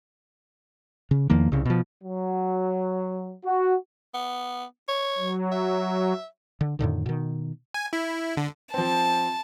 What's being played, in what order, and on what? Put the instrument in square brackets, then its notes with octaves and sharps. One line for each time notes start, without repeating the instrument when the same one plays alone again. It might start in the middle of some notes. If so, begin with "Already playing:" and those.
[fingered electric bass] C#3
E2 D#3 F3 A#3
C2 C#3
B2 F3
[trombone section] F#3
F#4
[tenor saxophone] B3
C#5
[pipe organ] F#3
[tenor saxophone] E5
[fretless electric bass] D3
F2 A2 D3 D#3
B2 D#3
[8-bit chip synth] G#5
E4
D3
[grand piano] F3 C4 [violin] A5